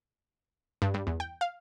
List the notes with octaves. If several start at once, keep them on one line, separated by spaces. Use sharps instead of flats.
G2
G2
E2
G5
F5